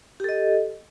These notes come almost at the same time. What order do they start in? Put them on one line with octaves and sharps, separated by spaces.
G4 A4 D#5